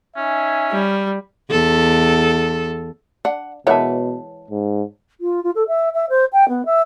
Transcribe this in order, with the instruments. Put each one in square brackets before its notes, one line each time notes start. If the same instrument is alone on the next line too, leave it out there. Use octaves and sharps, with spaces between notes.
[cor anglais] C#4 [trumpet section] D#4 E5 G#5
[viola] G3
[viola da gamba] E2 A4
[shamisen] D4 [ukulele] F#5
[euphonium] B2 [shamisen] E3 G#3 A#4 [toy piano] C#5 A5 [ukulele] E5 F#5
[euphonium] G#2
[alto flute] F4
F4
A4
E5
E5
C5
G5
B3
E5